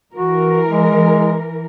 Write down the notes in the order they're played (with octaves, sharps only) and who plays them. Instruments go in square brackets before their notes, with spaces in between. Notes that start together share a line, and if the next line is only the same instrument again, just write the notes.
[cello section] E3 A#4 [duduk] F#4
[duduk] G#3